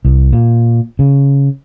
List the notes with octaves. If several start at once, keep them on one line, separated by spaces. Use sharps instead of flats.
C2
A#2
C#3